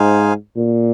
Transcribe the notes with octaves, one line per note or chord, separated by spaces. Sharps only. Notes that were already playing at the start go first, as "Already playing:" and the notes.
Already playing: G#2 D#4 G#4 C5 F5 G#5
A#2